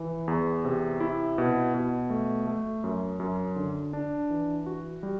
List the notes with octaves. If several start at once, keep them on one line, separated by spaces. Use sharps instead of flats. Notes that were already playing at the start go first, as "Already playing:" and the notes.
Already playing: E3
E2
C3
E4
B2
B2
A3
A3
F#2
F#2
D3
D4
E3
F#4
G3